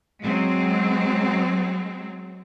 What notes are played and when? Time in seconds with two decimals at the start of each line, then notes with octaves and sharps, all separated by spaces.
0.22 F#3 G#3 C4